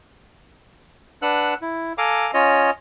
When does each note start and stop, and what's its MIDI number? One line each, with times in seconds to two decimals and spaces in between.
1.22 1.54 62
1.22 1.54 71
1.22 1.54 78
1.22 1.54 88
1.22 1.54 90
1.62 1.93 64
1.98 2.31 69
1.98 2.31 77
1.98 2.31 80
1.98 2.31 82
1.98 2.31 86
2.34 2.71 61
2.34 2.71 65
2.34 2.71 73
2.34 2.71 75